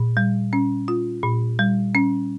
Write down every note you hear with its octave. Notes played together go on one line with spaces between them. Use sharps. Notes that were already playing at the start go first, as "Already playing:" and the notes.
Already playing: A#2
G3
C#4
F4
A#2
G3
C#4